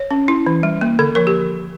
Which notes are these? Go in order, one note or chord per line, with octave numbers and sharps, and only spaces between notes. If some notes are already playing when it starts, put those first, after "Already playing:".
Already playing: C#5
C#4
E4
E3
G3
A#3
D3 A4
F3 A#4
G4